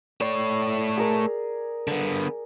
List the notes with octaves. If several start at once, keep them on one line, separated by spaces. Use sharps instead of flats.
A3 C#5 D5
G#4 A#4
D3 B3